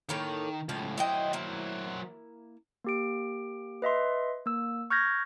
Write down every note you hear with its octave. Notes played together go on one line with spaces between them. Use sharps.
A2 D#3 A#3 C#5
C#2 A2 F3 F5
F#3 E4 C5 D#5 G5
A#3 E4
A#3 G4 D7
B4 D#5 E5 C6
A#3 E6
C#6 F6 G6 G#6 A#6